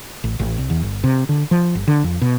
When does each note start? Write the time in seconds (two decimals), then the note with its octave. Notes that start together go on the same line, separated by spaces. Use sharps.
0.24 A1
0.39 A1
0.58 C2
0.70 E2
0.83 G1
1.04 C3
1.29 D3
1.51 F3
1.75 G1
1.87 D3
2.04 F2
2.21 B2